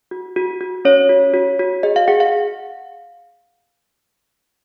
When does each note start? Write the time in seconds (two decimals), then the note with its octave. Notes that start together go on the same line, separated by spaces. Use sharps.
0.11 F#4
0.36 F#4
0.61 F#4
0.85 C#4 C#5
1.09 F#4
1.34 F#4
1.59 F#4
1.83 G#4 D#5
1.96 F5
2.08 G#4 F#5
2.20 F5